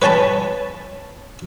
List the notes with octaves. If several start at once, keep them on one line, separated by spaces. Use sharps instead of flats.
B4 C#5 G#5 A5 B5